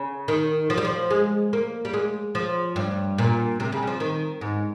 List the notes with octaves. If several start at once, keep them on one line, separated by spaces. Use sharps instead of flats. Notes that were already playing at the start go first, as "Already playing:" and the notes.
Already playing: C#3
D#3
F3
G3
F3
G#3
A#3
G3
G#3
F3
G2
A#2
C3
C#3
G3
F3
D#3
G#2